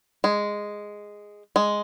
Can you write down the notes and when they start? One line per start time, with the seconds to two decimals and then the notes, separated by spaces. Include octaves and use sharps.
0.24 G#3
1.56 G#3